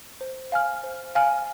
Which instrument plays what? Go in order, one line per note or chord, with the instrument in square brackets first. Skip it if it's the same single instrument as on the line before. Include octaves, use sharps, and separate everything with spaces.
[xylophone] C5
F5 G#5 F6
C5
F5 G#5 F6